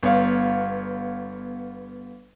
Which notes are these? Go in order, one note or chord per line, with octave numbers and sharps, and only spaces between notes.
G1 B3 C#5 F5